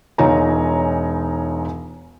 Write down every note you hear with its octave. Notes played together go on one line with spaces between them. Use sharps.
E1 D#4 F4 C#5 G#5 A#5